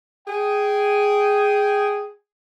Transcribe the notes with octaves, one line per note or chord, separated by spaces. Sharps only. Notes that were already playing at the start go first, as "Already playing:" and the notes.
G#4 G5